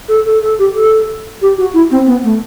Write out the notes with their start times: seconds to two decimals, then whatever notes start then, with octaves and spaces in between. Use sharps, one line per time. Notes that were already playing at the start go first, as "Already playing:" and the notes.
0.08 A4
0.26 A4
0.42 A4
0.59 G4
0.75 A4
1.41 G4
1.58 F#4
1.74 E4
1.91 C4
2.07 B3
2.23 A3